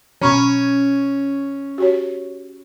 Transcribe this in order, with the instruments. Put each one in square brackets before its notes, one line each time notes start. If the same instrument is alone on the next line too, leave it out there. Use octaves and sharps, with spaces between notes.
[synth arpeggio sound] B2 F#3 [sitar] C#4 [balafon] A#5 B5 C#6
[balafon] F#4 G4 C#5